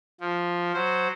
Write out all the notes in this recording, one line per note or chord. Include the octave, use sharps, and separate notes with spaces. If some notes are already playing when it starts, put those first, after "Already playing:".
F3
F#3 C5